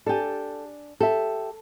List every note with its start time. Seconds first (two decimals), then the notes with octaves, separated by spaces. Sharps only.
0.06 D4 G4 A4 G#5
1.00 G4 A4 E5